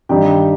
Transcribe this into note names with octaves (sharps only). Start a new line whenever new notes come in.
G2 D#3 G3 D4 G4